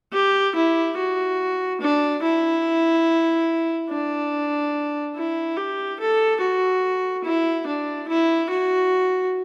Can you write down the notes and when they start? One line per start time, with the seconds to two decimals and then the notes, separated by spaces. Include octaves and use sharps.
0.13 G4
0.55 E4
0.97 F#4
1.81 D4
2.22 E4
3.90 D4
5.16 E4
5.57 G4
6.00 A4
6.41 F#4
7.24 E4
7.67 D4
8.08 E4
8.51 F#4